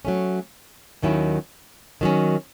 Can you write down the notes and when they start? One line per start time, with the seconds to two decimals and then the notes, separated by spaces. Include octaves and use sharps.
0.05 F#3 A3 C#4
1.02 D#2 D#3 F#3 C#4 E4
2.01 D#3 F#3 C#4